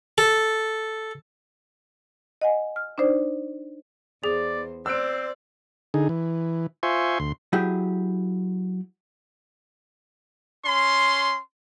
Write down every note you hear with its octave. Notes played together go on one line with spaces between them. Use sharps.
A4
D#5 F#5 G#5
F6
D4 D#4 C5 D5
E2 G#4 C5 D5
C4 C5 D5 E6 F#6 D7
D3 D#4 G#4
E3
F4 C5 E5 G#5 C6 C#6
D2 C6
F#3 E4 G4 G#4
C#4 C6